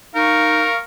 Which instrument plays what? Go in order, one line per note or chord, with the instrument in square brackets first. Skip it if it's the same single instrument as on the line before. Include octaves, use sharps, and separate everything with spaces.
[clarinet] D#4 [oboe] A#4 [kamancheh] F5 C#6